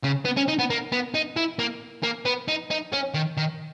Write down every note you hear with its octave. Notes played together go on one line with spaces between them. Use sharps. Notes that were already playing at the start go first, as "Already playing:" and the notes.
C#3
B3
C#4
D#4
B3
A#3
B3
D#4
E4
A#3
A#3
B3
D#4
D#4
C#4
D#3
D#3